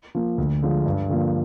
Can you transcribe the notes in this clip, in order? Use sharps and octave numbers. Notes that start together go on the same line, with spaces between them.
F3 A#3
D2
D3 F3 G#3
G2
D3 F3 A#3